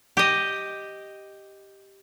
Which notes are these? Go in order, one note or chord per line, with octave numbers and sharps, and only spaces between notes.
G4 D#5